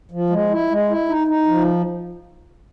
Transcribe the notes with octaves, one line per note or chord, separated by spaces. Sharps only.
F3
G#3
E4
G#3
E4
D#4
D#4
F3